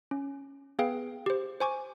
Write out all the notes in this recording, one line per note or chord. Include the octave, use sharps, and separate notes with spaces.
C#4
B3 G#4 B4 F5 G5
G4 C5
C5 G#5 C#6 D6